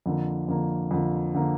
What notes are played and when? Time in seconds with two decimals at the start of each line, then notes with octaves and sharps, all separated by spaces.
0.06 F2 D3 A#3
0.48 F2 D3 A#3
0.91 F2 D3 A#3
1.35 D3 A#3